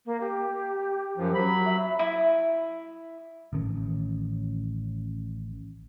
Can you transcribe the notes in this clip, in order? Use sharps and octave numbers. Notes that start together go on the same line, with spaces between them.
A#3
G4
F#2 F3
F#3 B5
E5
E4
A1 A2 D#3 C#4